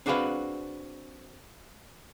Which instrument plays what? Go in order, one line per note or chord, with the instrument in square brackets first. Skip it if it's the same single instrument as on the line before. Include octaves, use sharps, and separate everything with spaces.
[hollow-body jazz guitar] C4 D4 F#4 G#4 B4 F5